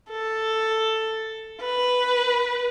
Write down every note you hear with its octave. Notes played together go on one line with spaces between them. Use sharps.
A4
B4